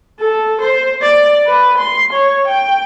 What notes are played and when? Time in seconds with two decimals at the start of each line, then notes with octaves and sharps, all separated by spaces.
0.21 A4
0.61 C5
1.02 D5
1.47 B4
1.78 C6
2.13 C#5
2.48 G5